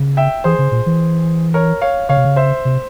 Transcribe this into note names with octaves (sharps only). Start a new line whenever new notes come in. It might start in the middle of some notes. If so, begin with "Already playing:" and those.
Already playing: C#3
E5 G5
E3 G#4 C5
C#3
A#2
E3
A#4 C#5
C#5 F5
C#3 C#5 F5
C3
C#3
C5 E5
C3